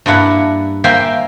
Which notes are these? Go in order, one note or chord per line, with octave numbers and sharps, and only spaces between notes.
G2 A#3 D4 E4 F#5
A#3 C5 E5 G5 G#5 C6